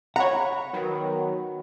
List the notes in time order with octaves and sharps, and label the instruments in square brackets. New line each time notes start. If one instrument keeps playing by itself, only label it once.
[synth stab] C#5 A#5 [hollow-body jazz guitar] F#5 [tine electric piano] B5
[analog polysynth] D#3 F#3 B3